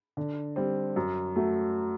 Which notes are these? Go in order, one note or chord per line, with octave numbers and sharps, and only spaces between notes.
D3
G3 C4
F#2
F#3 A3